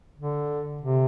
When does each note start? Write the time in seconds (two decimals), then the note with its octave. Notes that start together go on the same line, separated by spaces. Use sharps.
0.18 D3
0.81 C3